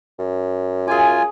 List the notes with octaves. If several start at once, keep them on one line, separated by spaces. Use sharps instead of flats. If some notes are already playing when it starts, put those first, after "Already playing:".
F#2
F4 G#4 G#5 D6